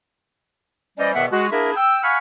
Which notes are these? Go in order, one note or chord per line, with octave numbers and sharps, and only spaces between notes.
E3 G3 C#4 C5 D5 D#5
E2 B2 D#3 B3 E5 F#5
G#3 F#4
A#3 D4 E4 G#4 A#4 E5
G5 E6
F5 F#5 G#5 B5 C#6 F6